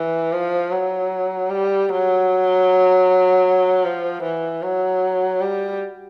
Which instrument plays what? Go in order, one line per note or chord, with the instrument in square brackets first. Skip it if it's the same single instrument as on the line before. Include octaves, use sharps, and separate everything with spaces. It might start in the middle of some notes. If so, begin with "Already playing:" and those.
Already playing: [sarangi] E3
F3
F#3
G3
F#3
F3
E3
F#3
G3